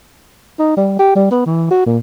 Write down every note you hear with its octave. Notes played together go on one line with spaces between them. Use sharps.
D#4
G3
G4
G3
B3
E3
F#4
A#2